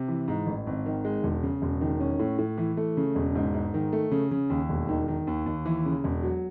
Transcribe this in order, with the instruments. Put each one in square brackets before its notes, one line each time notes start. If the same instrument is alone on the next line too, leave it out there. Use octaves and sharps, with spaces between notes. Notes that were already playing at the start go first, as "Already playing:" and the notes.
Already playing: [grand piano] C3
E3
G#2
A1
G#1
D#3
G#3
E1
C#3
E1
D#3
C#4
A2
A2
E3
A3
C#3
E1
G#2
G#2
D#3
A3
C#3
C#3
D#2
E1
D#3
D#3
D#2
D#2
E3
C#3
E1
F#3